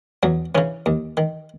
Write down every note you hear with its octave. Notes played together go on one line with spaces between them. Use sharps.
E2 F#3
C#3 E3 C#4
D#2
D#3